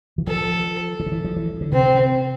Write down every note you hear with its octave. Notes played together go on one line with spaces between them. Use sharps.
E3
F3 A4
E3
D3
E3
F3
E3
D3
C3 C4